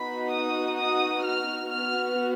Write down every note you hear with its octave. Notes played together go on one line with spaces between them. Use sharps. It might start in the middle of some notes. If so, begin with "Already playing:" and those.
Already playing: B3 D#4 F#4 B5
D#6
D#6
F6
B3 F#4 F6